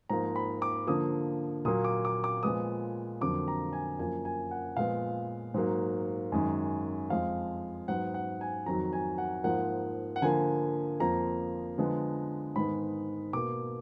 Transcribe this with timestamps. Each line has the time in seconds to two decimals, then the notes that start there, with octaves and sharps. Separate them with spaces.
0.09 G#2 F3 A#3 A#5
0.36 B5
0.62 D6
0.87 D3 F3 A#3 D#6
1.65 A#2 F#3 A#3 D#6
1.85 D6
2.05 D6
2.24 D6
2.43 A#2 F3 G#3 B3 D#6
3.21 F2 D3 F#3 A#3 D6
3.48 A#5
3.73 G#5
3.99 F#2 F3 A#3 G#5
4.25 G#5
4.51 F#5
4.77 A#2 F3 G#3 B3 F5
5.54 G#2 F#3 A#3
6.32 F#2 D#3 G#3
7.10 F2 F3 G#3 F5
7.88 G#2 F#3 B3 F#5
8.14 F#5
8.41 G#5
8.66 F2 D#3 F#3 A#5
8.93 G#5
9.18 F#5
9.44 G#2 F3 A#3 F#5
10.16 F#5
10.22 D3 F3 A#3 G#5
11.00 F2 F3 A#3 A#5
11.78 D3 F3 G#3 B3
12.56 G#2 D#3 G#3 B3 B5
13.33 B2 A#3 D6